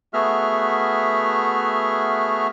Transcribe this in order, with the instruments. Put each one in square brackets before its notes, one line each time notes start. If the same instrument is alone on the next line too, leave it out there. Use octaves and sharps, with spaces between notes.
[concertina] A3 B3 F#4 G#4 E5 F6